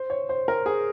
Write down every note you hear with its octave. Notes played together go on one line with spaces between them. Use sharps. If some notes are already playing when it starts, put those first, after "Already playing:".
Already playing: C5
C#5
C5
A#4
G#4